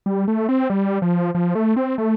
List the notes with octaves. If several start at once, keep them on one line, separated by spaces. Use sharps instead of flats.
G3
A3
C4
G3
F3
F3
A3
C4
A3